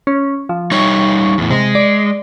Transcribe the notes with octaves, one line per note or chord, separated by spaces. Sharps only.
C#4
F3
G3 D#4 C#5 C#6
E2 A2
C3 G#3
D5